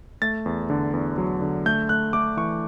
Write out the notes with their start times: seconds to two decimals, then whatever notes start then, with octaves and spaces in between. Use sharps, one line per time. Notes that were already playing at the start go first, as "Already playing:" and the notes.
0.22 A3 A6
0.46 E2
0.70 D3
0.93 E2
1.18 F#3
1.41 D3
1.66 A3 G6
1.89 A3 F#6
2.13 A3 D6
2.37 E3 C#6